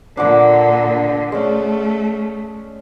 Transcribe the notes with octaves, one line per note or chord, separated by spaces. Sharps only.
A#2 D3 D4 F#5 D6
G#3 A3 C#4